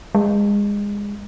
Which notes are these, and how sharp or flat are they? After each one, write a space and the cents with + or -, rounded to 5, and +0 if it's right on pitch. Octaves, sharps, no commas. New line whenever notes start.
G#3 -25